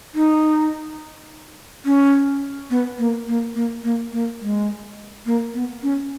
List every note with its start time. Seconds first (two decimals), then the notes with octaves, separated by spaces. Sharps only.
0.15 D#4
1.85 C#4
2.70 B3
2.99 A#3
3.27 A#3
3.55 A#3
3.84 A#3
4.13 A#3
4.41 G#3
5.26 A#3
5.54 B3
5.83 C#4